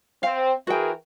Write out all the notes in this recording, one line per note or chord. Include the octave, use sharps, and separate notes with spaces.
C4 F5
E3 F#4 G#4 A#4 G5